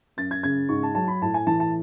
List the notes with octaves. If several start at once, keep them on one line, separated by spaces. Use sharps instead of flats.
F#2 A6
G#6
C#3 G#6
G#2 C#6
A5
F#3 A5
B5
A2 A5
G#5
E3 A5
A5